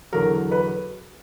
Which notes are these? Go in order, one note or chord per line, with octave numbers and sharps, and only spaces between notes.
E2 D3 F#3 A#4
B4